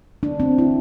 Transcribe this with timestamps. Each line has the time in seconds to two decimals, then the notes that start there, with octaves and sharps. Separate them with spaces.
0.23 D4
0.40 C4
0.58 E4